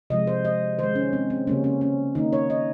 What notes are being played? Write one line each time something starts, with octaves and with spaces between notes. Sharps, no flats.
C3 F3 G#3 D#5
C5
D#5
D#3 G#3 C5
C#4
C4
C4
C#3 G3 A#3 C#4
C#4
C#4
D#3 A#3 D#4
C#5
D#5